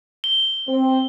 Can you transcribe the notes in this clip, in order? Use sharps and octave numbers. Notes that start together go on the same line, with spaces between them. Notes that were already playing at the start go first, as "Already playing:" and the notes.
G7
C4